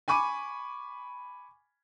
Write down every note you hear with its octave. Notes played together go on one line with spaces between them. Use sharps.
G#5 B5 C#6 D6 D#7